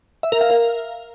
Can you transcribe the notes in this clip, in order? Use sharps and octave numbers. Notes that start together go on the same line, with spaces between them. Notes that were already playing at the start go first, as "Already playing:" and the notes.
E5
A#4
F5
A#4